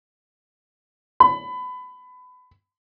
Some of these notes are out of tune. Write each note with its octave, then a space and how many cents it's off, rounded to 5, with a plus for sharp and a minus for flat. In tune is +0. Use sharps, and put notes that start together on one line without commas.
B5 +25